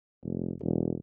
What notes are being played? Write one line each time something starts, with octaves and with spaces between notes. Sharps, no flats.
F1
E1